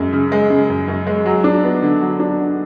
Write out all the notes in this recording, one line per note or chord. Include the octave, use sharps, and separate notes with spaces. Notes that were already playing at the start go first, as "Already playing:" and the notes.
Already playing: F#2 G#3
C#3
G#3
C#3
F#2
F#2
G#3
F#3
D4
B3
D3
F#3
D4
D3